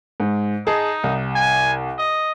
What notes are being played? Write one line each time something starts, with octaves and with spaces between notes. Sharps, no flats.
G#2
D#4 G#4 D#5 A5
C2
G#5
D#5